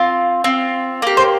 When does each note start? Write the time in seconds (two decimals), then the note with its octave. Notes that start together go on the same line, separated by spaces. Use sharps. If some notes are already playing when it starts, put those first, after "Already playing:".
Already playing: C4 F4
0.44 C4 F4
1.02 A#3 G4
1.17 C5